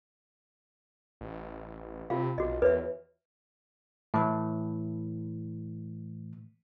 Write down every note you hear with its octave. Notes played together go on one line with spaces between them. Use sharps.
A1
C3 F4 F5
B1 F#4 D#5
E2 B4 C#5 E5
A2 E3